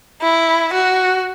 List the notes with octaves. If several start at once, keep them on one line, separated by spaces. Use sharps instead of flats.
E4
F#4